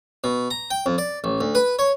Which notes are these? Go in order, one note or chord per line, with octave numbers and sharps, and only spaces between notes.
B2
A#5
G5
F2
D5
A1
D2
B4
C#5